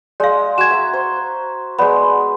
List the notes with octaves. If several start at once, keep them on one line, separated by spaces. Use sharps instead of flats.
G#3 D5 F5
F#4 G#6 E7
E5 A#5
C5
G#3 B3 D5 B5